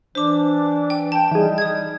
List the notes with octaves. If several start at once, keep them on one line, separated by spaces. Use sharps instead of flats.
E3 D4 C5 D6
G5
G5 A5
E3 G3 D#4 G#4
D#6 G#6